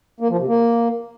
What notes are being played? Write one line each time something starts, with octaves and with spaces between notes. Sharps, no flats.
A#3
F3
C3
A#3